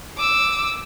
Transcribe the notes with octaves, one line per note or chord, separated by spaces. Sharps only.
D6 E6